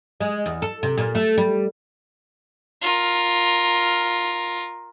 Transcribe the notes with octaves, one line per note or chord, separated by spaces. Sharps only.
G#3
E2
A4
C3
A#2
A3
G3
F4 A#4